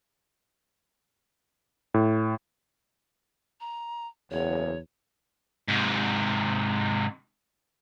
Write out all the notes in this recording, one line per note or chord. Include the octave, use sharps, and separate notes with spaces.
A2
A#5
F#1 E2 C#5
G#2 C3